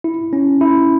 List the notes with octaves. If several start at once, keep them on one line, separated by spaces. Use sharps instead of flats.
E4
C#4
E4